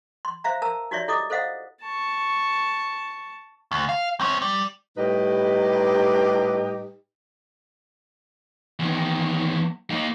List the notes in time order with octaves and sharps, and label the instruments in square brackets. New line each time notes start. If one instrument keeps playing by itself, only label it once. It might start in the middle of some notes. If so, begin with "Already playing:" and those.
[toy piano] C6
C5 E5 F5 A#5
A#4 A5 A#5 E6
D#4 F#4 G4 C#5 D5 E5
E4 G4 A4 D#5 D6 D#6
A4 C5 D#5 F5 F#5
[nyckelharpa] A5 C#6
[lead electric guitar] D2
F5
C4 C#4
G3
[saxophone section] A2 G3 D#4 G4 B4 D#5
[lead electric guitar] E2 D#3
A#3 D#4